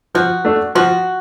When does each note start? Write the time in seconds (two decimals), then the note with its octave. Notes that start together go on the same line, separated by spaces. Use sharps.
0.15 F3 F#4
0.45 A3 D4
0.75 F3 F#4